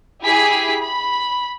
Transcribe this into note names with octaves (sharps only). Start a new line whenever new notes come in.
E4 G4 G#4 G#5 B6
B5